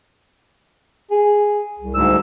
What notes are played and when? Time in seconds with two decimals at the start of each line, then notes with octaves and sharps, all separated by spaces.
1.11 G#4
1.79 C2
1.94 D2 G#2 E6